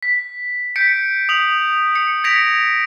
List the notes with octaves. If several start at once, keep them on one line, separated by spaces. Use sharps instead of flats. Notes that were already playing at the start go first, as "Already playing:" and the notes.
B6
G6 B6 C#7 D7
D#6 F7 F#7
C#7
G#6 A#6 B6 C#7 D7 F7